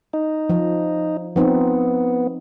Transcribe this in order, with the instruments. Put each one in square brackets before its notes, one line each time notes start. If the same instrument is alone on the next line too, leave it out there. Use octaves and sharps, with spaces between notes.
[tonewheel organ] D#4
[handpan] F3
[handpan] F3 C4 D#4 [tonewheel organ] B3